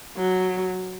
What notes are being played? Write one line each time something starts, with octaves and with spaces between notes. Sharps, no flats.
F#3